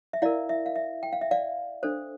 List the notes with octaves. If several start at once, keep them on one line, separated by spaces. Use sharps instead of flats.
E5
E4 A#4 D5 F5
E5
F5
E5
G5
F5
E5
D5 F5
D4 A4 C5